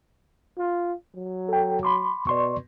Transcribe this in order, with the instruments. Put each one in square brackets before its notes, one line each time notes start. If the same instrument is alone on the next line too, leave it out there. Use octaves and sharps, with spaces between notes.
[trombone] F4
F#3
[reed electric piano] A4 G5
B5 C6 D6
[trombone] B2 [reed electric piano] D5 C6 C#6